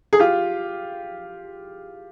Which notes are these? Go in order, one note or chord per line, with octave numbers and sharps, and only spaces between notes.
G#4
F4 G4